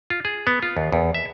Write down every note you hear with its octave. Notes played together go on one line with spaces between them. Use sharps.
F4
G#4
B3
F4
D#2
E2
E5